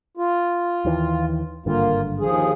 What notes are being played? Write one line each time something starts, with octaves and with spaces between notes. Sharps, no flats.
F4
D#2 D#3 E3
G#1 G2 D3 A#3 F4
D#2 F3 G#4